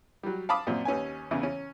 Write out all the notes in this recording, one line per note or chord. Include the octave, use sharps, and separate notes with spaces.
F#3 G3
F5 A5 B5 D6 D#6
F#2 A#2 C4
D#2 C#4 B4 G#5
E2 C#3 E3 E4
C#4